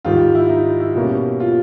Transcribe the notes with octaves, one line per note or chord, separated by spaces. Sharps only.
G#2 D#3 G3 F4
E4
D#4
E4
B2 G3 A#3 C#4
F4